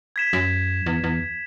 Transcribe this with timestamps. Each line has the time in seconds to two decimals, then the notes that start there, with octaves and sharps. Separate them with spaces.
0.16 G#6 B6 E7
0.33 F#2
0.86 E2
1.04 E2